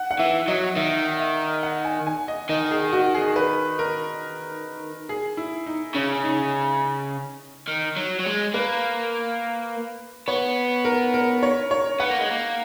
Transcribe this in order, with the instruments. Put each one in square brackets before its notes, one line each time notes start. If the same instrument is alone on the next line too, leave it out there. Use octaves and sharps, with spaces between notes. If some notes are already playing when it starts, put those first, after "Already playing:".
Already playing: [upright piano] F#5
F#5
[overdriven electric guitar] E3 [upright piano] E5
[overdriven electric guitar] F#3 [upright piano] D#5
[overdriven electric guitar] D#3 [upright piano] E5
[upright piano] E5
F#5
G#5
G#5
D#5
[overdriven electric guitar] D#3 [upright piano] D#5
[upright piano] G#4
F#4
G#4
B4
A#4
G#4
E4
D#4
[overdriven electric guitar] C#3 [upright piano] C#4
[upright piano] D#4
[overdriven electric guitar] D#3
F#3
F#3
G#3
[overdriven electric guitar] A#3 [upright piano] B4
[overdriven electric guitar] B3 [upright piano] C#5
[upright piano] A#4
A#4
C#5
C#5
[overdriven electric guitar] B3 [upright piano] F#5
[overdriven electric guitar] A#3
G#3
A#3